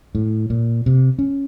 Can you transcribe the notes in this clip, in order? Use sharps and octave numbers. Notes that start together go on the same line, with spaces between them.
A2
A#2
C3
C#4